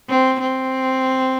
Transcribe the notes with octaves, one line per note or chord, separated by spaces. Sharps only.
C4
C4